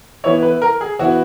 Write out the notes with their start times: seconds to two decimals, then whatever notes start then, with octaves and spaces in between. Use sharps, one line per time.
0.24 E3 B3 E4 C#5
0.42 B4
0.62 A#4
0.81 G#4
0.99 E3 B3 E4 F#4